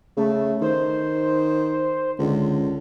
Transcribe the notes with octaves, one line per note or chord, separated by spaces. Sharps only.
C#3 A3
D#3 C5
C#2 D3